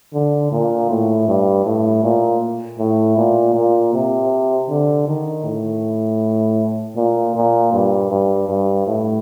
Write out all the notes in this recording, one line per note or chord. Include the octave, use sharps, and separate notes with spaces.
D3
A#2
A2
G2
A2
A#2
A2
A#2
A#2
C3
D3
D#3
A2
A#2
A#2
G2
G2
G2
A2